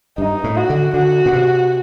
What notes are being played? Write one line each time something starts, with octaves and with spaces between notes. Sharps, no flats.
G2 D#4
A2
F#4
D3
D3 F#4
A#2
C3